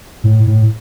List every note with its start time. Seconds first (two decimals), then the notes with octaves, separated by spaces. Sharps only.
0.24 A2
0.46 A2